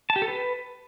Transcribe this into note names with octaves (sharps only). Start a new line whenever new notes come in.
A5
G4
A4
B4